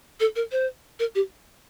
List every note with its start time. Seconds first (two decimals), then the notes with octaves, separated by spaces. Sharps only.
0.20 A4
0.36 A#4
0.52 C5
0.99 A#4
1.15 G4